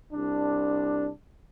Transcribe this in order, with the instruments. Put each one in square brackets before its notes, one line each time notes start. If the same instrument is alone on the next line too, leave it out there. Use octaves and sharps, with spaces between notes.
[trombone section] C2 D4